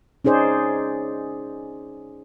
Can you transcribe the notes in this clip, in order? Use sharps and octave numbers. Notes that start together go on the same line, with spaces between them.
C#4 D#4 G#4 C5 D5